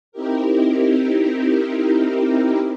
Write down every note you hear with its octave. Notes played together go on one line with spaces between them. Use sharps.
C4 D#4 E4 G4 A#4